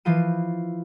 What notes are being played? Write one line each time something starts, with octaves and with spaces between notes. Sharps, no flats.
E3 F3 F4 D#7